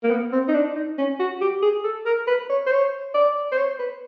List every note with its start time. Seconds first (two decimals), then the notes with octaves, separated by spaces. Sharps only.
0.03 A#3
0.11 B3
0.33 C4
0.48 D#4
0.54 D4
0.76 D#4
0.98 C#4
1.20 F#4
1.41 G4
1.62 G#4
1.84 A4
2.05 A#4
2.27 B4
2.50 C#5
2.66 C5
2.71 C#5
3.14 D5
3.52 C5
3.58 C#5
3.79 B4